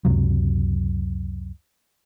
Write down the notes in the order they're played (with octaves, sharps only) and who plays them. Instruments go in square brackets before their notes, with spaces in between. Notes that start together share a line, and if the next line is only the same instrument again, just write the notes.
[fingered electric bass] C#2 F#2 C3 F#3